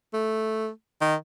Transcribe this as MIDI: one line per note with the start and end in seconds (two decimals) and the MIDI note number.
0.13 0.69 57
1.01 1.15 51